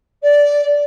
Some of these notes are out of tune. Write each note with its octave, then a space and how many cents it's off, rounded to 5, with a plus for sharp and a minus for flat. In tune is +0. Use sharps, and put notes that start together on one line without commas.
D5 -10